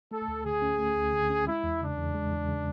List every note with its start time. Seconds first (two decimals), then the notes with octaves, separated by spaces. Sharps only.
0.11 A3 A4
0.28 D2
0.44 D3 G#4
0.62 C#4
0.79 A3
0.96 D2
1.13 D3
1.30 C#4
1.46 G#3 E4
1.64 E2
1.81 C#3 D4
1.97 E2
2.15 G#3
2.32 E2
2.48 C#3